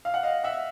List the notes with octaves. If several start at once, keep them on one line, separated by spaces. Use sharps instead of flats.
F5
F#5
D#5 F5
E5 F#5